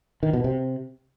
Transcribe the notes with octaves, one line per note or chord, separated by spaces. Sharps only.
D#3
B2
C3